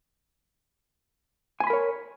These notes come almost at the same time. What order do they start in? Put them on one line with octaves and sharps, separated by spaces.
G#5 C6 B5 A#4 C#5